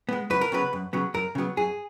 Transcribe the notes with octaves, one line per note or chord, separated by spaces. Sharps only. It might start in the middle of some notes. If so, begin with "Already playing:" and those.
G#3 B3
F#2 B4
A#4
C#3 F#3 B3 B4
F#2
C#3 F#3 B3
F#2 A#4
C#3 F#3 B3
F#2 G#4